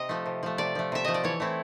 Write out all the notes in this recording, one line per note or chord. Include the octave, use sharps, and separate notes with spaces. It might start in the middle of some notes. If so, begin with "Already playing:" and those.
Already playing: C3 D#5
F3 A3
C3
F3 A3
C3 D5
F3 A3
C3 E5
F3 A3 D#5
D5
E3 C#5
A3 C4 E4